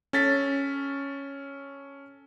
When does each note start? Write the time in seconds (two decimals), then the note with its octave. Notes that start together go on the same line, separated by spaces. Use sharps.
0.13 C#4 A4 A6 B6